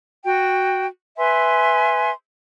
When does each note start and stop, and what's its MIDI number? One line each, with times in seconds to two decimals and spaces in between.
0.25 0.86 66
0.25 0.86 79
1.18 2.10 71
1.18 2.10 76
1.18 2.10 80
1.18 2.10 84